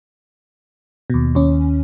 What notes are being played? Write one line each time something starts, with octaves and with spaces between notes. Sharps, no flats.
D#2 B2
D#2 C#4